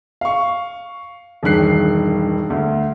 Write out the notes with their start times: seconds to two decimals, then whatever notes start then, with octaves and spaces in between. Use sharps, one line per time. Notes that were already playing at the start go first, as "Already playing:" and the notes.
0.21 F5 C#6
1.43 E1 G2 D#3 F#6 C7
2.50 D2